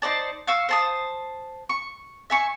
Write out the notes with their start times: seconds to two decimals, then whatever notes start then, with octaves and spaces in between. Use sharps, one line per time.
0.02 D#4 C5 D5 A5
0.47 F5 C#6 E6
0.69 C5 A5 D#6
1.69 C#6
2.30 E5 G#5 C#6